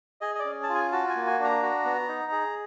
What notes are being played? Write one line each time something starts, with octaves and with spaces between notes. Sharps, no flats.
G#4 D#5
D#5
D5
C#4
A5
F4
G#5
F#4 A5
G#5
A#3
G#5
D4
A#5
F#4
B3
D#4
G#4